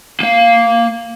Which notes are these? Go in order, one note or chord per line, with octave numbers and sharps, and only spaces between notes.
A#3 F5